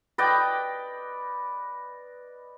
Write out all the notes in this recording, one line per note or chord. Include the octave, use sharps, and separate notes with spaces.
B4 D5 D#5 G5